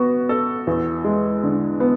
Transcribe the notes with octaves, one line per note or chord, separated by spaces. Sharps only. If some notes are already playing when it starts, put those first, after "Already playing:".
Already playing: B3 F#4
A4
E2
G#3
D3
B3